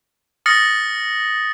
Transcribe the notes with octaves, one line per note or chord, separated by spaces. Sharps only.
D#6 F6 A6 A#6 C#7